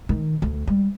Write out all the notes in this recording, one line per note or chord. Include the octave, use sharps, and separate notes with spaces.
D#3
D2
G3